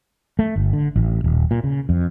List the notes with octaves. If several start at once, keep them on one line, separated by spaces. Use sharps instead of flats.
A3
G1
D3
A1
D#1
A#2
C#3
F2